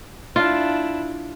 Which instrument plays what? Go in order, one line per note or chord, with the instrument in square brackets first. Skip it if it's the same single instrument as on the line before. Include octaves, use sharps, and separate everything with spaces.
[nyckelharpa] D4 E4 [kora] F4